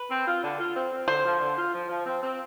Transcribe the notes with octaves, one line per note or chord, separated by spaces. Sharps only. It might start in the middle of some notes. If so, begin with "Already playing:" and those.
Already playing: B4
C4
F4
D3
F4
C4
C4
D3 C5
F3
D3
F4
F3
F3
C4
C4